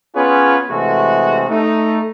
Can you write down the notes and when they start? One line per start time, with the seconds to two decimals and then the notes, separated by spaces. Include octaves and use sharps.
0.15 B3 C#4 F4 G#4 B4 C#5
0.69 C3 E3 G#3 A3 F#4
1.48 A3 D#4